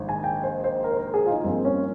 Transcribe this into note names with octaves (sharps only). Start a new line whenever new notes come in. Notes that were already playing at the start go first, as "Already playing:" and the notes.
Already playing: A#1 G#2 D#3
G#5
G5
C5
C5
A#4
C5
A#4
G#4
F4
D#4
G2 F3 A#3 C4
C#4